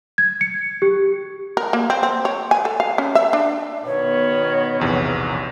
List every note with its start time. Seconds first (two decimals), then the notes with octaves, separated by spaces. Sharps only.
0.18 G#6
0.41 C#7
0.82 G4
1.57 A#4
1.73 A#3
1.90 C4
2.03 C4
2.25 C#5
2.51 G#5
2.65 A4
2.80 F5
2.98 C#4
3.15 E5
3.33 D4
3.85 B2 D#3 B3 C#5
4.80 A#1 E2 C3